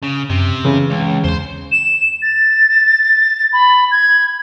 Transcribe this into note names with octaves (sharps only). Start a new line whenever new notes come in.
C#3
F#2 C3
C#3 E3
C#2
E2 C5 C6
E7
A6
B5
G#6